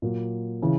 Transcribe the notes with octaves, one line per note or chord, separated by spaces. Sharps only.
A#2 F#3 A#3
C#3 E3